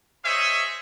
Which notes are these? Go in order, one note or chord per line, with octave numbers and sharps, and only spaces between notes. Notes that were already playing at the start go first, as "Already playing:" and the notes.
G#4 C5 C#5 D#5 E5